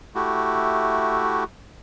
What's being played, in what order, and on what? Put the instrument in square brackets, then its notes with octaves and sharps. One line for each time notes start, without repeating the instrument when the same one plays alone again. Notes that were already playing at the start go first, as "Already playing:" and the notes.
[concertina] A3 E4 F#4 G4